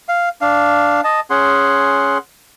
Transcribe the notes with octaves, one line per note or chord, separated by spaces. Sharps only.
F5
D4 F5
D#5 A5
C#4 G#4 F#5 C6